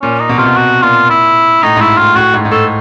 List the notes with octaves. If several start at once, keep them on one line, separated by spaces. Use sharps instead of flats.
A#2 C#4
D#4
B2
C3 F4
B2
F#4
A#2 F4
E4
A2 D#4
G#2
A2 E4
A2 F4
A2 F#4
G#2
G#2
A2 A4